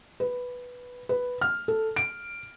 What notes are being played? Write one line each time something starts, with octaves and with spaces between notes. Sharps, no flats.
B4
B4
F6
A4
D7